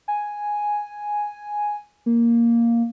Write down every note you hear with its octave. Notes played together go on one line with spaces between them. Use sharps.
G#5
A#3